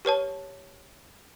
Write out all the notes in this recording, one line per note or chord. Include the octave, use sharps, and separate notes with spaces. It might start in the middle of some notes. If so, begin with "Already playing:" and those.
G4 B4 C#5 A5